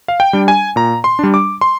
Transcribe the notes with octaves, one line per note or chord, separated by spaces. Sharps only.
F5
G5
G3 D4
G#5
A#2 A#5
C6
G3 D4
D6
C6